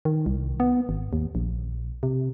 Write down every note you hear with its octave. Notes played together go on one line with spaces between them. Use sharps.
D#3
C2
B3
G#1
D#2
A#1
C3